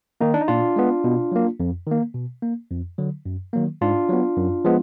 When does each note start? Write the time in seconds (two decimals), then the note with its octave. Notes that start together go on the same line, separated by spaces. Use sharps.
0.21 D#3 A#3 D#4
0.34 D4
0.41 D#4
0.48 A#2 D4 F4
0.76 G#3 B3
1.04 B2
1.32 F#3 A#3
1.60 F2
1.87 D#3 A#3
2.15 B2
2.43 A#3
2.70 F2
2.98 D3 F#3
3.26 F#2
3.53 D#3 F#3 A#3
3.81 G#2 D4 F4
4.09 F#3 B3
4.37 F#2
4.65 F3 G#3 B3